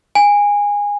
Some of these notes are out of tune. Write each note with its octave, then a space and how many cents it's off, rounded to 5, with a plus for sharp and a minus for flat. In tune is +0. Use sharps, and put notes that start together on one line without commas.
G#5 -20